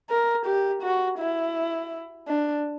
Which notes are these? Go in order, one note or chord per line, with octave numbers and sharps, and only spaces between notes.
A#4
G4
F#4
E4
D4